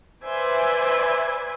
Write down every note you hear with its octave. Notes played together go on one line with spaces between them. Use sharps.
B4 C5 D5 E5 G#5